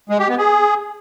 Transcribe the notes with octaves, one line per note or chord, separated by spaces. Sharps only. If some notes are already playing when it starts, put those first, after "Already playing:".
G#3
G4
B3
G#4